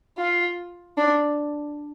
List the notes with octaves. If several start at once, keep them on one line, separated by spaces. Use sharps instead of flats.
F4
D4